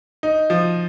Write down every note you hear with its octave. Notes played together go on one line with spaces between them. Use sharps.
D#4
F3